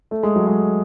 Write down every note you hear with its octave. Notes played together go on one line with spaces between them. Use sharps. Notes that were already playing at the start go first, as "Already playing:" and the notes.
A3
G#3
F#3
G#3